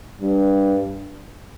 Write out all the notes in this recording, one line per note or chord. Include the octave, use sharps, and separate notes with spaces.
G2